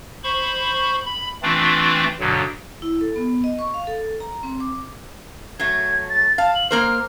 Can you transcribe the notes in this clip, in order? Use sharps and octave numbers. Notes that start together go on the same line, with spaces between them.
C5 B5 C#6
B5
E3 A3 C4 D4 F4
G2 B2 D3 F#3
E4
A4
B3
D#5
C#6
F5
A4
A#5
C4
D6
F#3 A3 G#6
A6
F5 A5
F#7
A#3 A#4 C5 F6